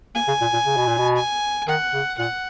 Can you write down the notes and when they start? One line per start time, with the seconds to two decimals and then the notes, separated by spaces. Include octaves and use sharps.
0.15 A#3 G#5
0.28 C#3
0.41 A#2
0.53 A#2
0.66 C#3
0.77 B2
0.87 A#2
0.98 B2
1.17 G#5
1.68 D#3 F#5
1.93 C#3
2.18 A#2 F#5